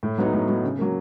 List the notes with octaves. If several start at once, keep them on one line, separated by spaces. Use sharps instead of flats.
A2
F#3 B3 D#4
A2
F#3 B3 D#4
C#3
F#3 A#3